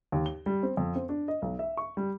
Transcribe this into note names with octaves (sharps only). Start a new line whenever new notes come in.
D#2
G7
G3
C4
F2
C4
D4
D#5
B1
E5
C#6
G3